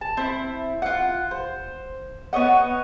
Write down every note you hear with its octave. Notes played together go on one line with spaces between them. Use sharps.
A5
C4 E4
F4 F#5
C5
B3 C#5 D#5 F#5